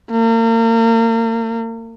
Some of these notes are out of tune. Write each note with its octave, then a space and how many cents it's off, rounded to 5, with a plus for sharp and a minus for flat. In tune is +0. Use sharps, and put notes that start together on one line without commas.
A#3 -40